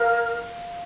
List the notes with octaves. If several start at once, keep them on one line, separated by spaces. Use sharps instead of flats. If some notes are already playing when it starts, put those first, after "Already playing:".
Already playing: A#4 F5